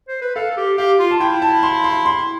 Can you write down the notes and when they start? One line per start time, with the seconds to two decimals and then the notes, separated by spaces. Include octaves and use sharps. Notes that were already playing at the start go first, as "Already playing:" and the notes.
0.08 C5
0.22 B4
0.36 A4 F5
0.50 A4
0.57 G4
0.77 G4 F5
0.99 F4
1.11 A5
1.20 E4 G5
1.42 A5
1.63 C6
1.84 C6
2.06 C6